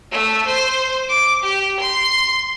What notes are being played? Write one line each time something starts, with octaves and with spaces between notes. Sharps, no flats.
A3
C5
D6
G4
C6